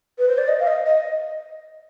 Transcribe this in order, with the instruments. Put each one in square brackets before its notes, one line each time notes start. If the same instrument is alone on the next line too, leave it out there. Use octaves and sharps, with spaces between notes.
[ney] B4
C5
D5
D#5
F5
D#5
D#5